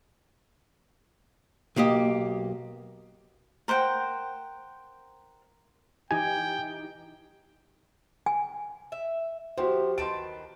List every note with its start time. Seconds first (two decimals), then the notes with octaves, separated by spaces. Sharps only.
1.76 B1 A#3 G4 D#5
3.68 A#4 C5 F#5 G5
6.11 E3 D#4 G4 G5 G#5
8.26 G#5
8.92 E5
9.58 F3 F#4 G4 C5
9.98 D#3 B4 A5 C6 D7